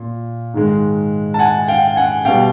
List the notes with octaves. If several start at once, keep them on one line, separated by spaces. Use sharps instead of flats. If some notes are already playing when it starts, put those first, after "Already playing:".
Already playing: A#2
G#2 D#3 G#3
A5
F#5 G#5
F5 G5
F#5 G#5
B2 G3 F5 G5